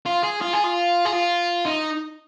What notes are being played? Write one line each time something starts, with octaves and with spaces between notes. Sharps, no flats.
F4
G#4
F4
G#4
F4
G#4
F4
D#4